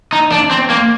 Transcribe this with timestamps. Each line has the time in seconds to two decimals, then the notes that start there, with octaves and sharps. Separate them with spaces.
0.13 D#4
0.32 D4
0.51 C4
0.70 A#3